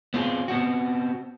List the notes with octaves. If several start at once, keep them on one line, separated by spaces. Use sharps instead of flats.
B3 C4 F4 G4 G#4
B3 C4 F#4